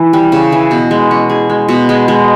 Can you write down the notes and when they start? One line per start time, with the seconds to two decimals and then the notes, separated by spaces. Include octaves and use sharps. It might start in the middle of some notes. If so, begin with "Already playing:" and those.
Already playing: E3
0.13 G3
0.32 C#3
0.52 E3
0.71 B2
0.91 G#3
1.11 C#4
1.30 G#4
1.50 G#3
1.69 B2
1.89 G#3
2.08 G#3